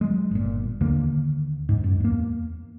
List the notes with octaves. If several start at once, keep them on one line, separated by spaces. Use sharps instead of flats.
F#3 G#3
G1 A#2
D#2 D3 A#3
G#2
F#2
E2 A#3